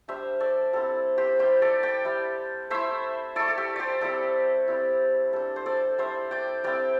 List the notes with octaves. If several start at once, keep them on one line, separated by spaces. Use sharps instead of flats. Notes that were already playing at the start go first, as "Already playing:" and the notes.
G3 D4 C5 E5
A4 D5
G3 C4 E4 A4
G4 C5
G3 E4 G4 C5
A4 D5
D5 G5
G3 E4
A3 E4 C5 E5
A3 E4 A4 D5
A4
G4
G4 C5 D5
G3 C4 E4 A4
G3 C4 E4
G3 D4 A4
C5
A4 D5
G3 E4 C5 E5
D5 G5
G3 C4 E4 D5 G5